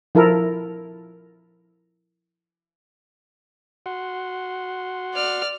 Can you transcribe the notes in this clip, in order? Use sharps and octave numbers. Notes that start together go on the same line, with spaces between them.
F3 E4 A4 A#4
F#4 F#5 C6
D5 F6